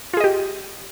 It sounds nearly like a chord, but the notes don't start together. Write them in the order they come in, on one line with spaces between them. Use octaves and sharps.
F4 G#4 D#5 G4